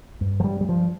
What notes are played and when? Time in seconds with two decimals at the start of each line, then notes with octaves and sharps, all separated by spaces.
0.21 G2
0.40 F3
0.44 G2 G3
0.61 G3
0.69 G2 F3